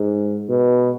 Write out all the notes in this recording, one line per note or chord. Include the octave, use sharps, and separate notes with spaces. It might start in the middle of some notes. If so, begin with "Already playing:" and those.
Already playing: G#2
B2